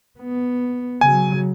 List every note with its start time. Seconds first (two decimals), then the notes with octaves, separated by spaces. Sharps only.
0.20 B3
1.01 C#3 F#3 G#5